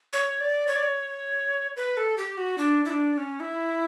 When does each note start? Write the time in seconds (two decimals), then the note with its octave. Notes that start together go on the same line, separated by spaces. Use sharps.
0.13 C#5
0.41 D5
0.68 C#5
0.76 D5
0.83 C#5
1.77 B4
1.97 A4
2.17 G4
2.38 F#4
2.58 D4
2.85 E4
2.90 D4
3.13 D4
3.18 C#4
3.40 E4